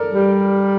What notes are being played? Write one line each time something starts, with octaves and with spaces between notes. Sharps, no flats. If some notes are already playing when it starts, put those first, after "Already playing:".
Already playing: A4 A#4 D5
G3